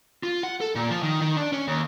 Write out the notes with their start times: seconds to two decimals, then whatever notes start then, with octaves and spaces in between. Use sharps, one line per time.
0.23 F4
0.43 F#5
0.61 A4
0.75 A#2
0.91 F3
1.03 D#3
1.21 D#3
1.37 D4
1.53 C#4
1.68 D#2